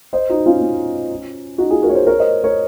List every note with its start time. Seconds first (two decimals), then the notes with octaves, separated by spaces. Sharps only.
0.13 C5 D#5
0.30 D#4 F#4
0.46 C#4 F4
0.61 C#4
1.58 D#4 F#4
1.70 F4 G#4
1.82 F#4 A#4
1.89 C#5
1.95 G#4 C5
2.07 A#4 C#5
2.19 C5 D#5
2.44 A#4 C#5